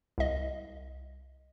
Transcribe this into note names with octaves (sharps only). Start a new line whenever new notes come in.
C2 D#5